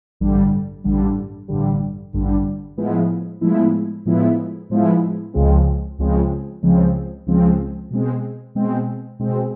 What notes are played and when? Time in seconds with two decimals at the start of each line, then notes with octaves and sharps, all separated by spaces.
0.20 A1 G2 D3 G3
0.84 A1 G2 D3 G3
1.48 A1 G2 D3 G3
2.13 A1 G2 D3 G3
2.77 A2 F3 G#3 B3 E4
3.41 A2 F3 G#3 B3 E4
4.06 A2 F3 G#3 B3 E4
4.70 A2 F3 G#3 B3 E4
5.34 C#2 C#3 F3 G#3 C4
5.99 C#2 C#3 F3 G#3 C4
6.63 C#2 C#3 F3 G#3 C4
7.26 C#2 C#3 F3 G#3 C4
7.91 B2 G#3 C4
8.55 B2 G#3 C4
9.20 B2 G#3 C4